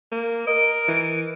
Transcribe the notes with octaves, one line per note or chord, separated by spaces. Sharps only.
A#3
A#4 D#5 D7
E3